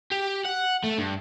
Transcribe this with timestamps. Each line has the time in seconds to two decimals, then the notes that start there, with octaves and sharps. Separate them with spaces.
0.11 G4
0.46 F#5
0.84 A3
0.98 G2